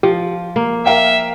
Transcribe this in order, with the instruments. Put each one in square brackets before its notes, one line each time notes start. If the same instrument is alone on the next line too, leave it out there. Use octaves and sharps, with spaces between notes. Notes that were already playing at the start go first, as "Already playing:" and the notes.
[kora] F3 [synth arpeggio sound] G4
[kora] A#3
[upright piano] A#4 F5 G5 [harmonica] E5